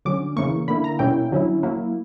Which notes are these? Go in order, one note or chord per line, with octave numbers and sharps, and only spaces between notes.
D3 F#3 C#4 D6
C#3 E3 A#3 C#6
D3 A#3 E4 B5
A#5
B2 G3 A#3 C#4 E4 G5
D3 F#3 C#4 E4
F#3 A#3 E4